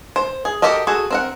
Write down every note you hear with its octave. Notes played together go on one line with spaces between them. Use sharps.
C5
G#4
F#4 G4 A4 A#4 D#5
F#4 G#4 A4
C4 A#4 F#5